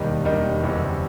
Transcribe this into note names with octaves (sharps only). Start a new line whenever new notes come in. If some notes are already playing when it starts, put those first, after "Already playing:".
Already playing: E1 D#2 D#3 G3 D#4
E1 D#2 D#3 G3 D#4
F#1 E2 C3 E3 G3